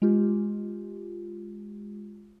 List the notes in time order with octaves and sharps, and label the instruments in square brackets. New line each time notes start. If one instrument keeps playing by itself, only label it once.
[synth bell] G#3 F4 G4